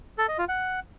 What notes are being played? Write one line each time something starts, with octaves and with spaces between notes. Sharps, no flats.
A4
D#5
F4
F#5